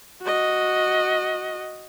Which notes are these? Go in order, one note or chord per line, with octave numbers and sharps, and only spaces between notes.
F#4 D#5